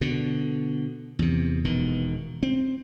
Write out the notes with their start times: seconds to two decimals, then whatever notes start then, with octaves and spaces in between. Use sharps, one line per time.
0.01 B2 D3
1.19 E2 C3
1.64 E1 B2 D#3
2.43 C4